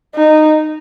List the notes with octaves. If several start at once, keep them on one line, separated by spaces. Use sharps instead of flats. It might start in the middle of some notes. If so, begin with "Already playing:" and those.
D#4